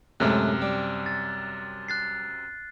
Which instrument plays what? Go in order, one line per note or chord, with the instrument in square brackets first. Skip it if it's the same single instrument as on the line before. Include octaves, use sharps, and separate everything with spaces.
[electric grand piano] F#2 C3 [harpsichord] A2 G#3 A3 [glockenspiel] F6 F#6
[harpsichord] G3
[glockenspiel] A6
F#6 A6 C7